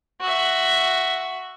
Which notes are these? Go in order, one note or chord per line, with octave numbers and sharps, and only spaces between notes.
F#4 E5